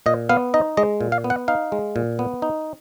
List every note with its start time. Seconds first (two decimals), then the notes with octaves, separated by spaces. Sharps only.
0.06 A#2 D#5
0.29 B3 F5
0.54 D#4 D#5
0.77 G#3 D#5
1.01 A#2
1.12 F5
1.24 B3
1.30 F#5
1.48 D#4 F5
1.72 G#3
1.96 A#2
2.19 B3
2.42 D#4